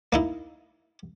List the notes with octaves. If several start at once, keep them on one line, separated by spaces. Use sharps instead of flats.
A#3 D#4 E4